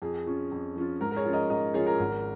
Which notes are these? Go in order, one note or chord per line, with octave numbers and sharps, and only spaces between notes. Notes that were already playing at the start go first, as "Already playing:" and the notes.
F2 G#4
F3 C#4 F4
F2
F3 C#4 F4
G#2 A#4
A#4
G#4 C#5
F3 C#4 F4
A#4 D#5
G#2 A#4 D#5
F3 C#4 F4 G#4 C#5
A#4
G#1